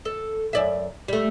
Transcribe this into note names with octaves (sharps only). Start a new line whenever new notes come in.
A4
F#2 D5 E5
G3 A3